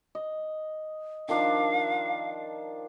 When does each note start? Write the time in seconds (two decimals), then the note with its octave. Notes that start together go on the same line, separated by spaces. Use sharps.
0.15 D#5
1.28 D#3 F3 D4 F5